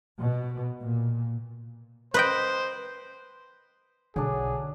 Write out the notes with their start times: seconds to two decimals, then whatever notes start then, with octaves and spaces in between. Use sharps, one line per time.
0.19 B2
0.81 A#2
2.14 B4 C5 D#5 G5
4.16 B1 D3 F#3 D4 G#4